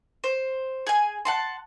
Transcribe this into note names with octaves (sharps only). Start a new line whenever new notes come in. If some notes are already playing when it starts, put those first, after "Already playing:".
C5
G#4 G#5
F#5 A5 C6